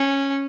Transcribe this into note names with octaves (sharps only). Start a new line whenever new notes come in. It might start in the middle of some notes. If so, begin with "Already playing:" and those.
Already playing: C#4